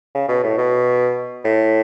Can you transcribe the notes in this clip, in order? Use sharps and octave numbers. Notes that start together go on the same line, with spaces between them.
C#3
B2
A2
B2
A2